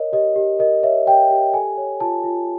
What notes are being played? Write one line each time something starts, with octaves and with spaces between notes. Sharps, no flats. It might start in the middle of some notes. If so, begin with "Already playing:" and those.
Already playing: A#4 C#5 D#5
G4 D#5
G4
A#4 D#5
C#5 E5
G4 G5
G4
A4 G#5
C#5
F4 A5
F4